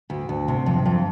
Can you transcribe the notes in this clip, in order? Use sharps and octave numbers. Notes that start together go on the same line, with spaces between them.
D2
D2
C3
F2
F2